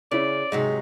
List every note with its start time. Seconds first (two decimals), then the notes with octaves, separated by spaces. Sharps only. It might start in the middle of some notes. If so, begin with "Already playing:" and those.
0.11 C#3 C#4 E4 D5
0.52 G#2 C3 F#3 D#4 G#4